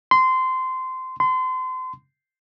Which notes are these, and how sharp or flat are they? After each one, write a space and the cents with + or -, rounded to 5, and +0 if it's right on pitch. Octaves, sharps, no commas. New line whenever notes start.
C6 -15
C6 -30